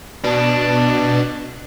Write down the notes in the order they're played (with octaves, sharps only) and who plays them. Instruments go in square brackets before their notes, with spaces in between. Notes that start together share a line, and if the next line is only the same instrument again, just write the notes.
[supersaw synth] B2 [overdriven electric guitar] D4